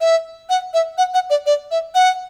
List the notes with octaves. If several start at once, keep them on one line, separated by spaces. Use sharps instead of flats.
E5
F#5
E5
F#5
F#5
D5
D5
E5
F#5